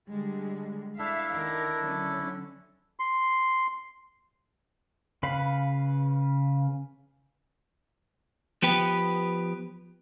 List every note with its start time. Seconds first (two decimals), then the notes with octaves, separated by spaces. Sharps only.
0.11 D3 G3 G#3
0.99 D4 E4 A4 E5 F5
1.32 D#3 A#4
1.82 D3 F#3 C#4
3.00 C6
5.23 C#3 B4 F5 B5
8.62 F3 B3 G4 B4